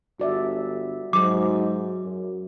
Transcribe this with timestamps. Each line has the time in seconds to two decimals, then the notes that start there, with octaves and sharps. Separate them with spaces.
0.20 G1 F#4 D5 E5
1.13 G#2 F#3 D6
2.04 F#2